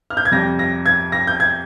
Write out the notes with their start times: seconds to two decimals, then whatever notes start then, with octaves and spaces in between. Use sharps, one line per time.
0.10 F6
0.17 G6
0.25 G#6
0.32 F2 C3 G3 A#6
0.59 A#6
0.86 G#6
1.12 A#6
1.27 G6
1.40 G#6